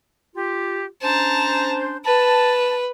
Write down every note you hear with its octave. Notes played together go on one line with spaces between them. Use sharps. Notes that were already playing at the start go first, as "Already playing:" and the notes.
F4 G4
C#4 D4 C5 A5 A#5
B4 A5